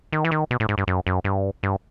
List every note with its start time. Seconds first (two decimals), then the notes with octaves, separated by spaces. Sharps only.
0.12 D#3
0.25 E3
0.31 D#3
0.51 B2
0.60 A2
0.69 G#2
0.78 G2
0.88 F#2
1.07 F#2
1.24 G2
1.63 G2